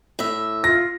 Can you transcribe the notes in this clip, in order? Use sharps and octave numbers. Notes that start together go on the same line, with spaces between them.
A2 E5
F4 A#6